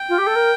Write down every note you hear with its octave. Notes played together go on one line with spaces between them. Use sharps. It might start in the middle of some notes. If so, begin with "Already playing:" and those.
Already playing: G5
F4
G4
A4
A#4